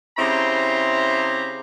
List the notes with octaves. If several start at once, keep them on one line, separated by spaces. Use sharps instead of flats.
C#3 C4 E4 G4 A#5 C6